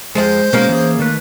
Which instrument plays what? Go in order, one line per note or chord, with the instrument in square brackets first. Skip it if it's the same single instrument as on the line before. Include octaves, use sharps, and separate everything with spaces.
[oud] F2 F3 G#4 [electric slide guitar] G#3 [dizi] C5
[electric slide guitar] B2 G#3 [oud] A#3 C#4
[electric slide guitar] E3 G#4
D#3 A3 B4